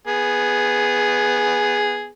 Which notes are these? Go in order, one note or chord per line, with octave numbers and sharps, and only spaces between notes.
B3 G#4